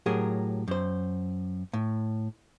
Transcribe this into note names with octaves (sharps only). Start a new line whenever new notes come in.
A2 F#3 G4 G#4 A#4
F#2 C5
A2